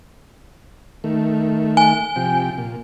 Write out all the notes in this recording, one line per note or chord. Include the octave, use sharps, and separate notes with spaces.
D#3 A3
G#5
C3 F3 G5
A#2